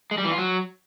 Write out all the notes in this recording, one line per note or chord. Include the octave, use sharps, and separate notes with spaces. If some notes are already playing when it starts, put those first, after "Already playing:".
G#3
G3
E3
F4
F#3